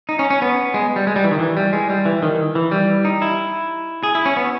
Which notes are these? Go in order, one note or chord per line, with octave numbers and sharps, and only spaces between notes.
D#4
C#4
C#4
B3
G#3
G3
G#3
G3
E3
D#3
E3
G3
G#3
G3
E3
D#3
E3
G3
D#4
E4
G#4
E4
C#4
B3